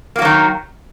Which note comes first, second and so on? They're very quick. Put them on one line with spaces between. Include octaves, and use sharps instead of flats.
A#3 F#4 F#3 D#3